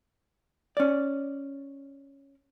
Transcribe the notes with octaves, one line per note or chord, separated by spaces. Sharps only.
C#4 D5